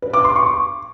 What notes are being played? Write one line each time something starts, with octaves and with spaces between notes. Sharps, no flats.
B4
D6
C6
C#6
C#6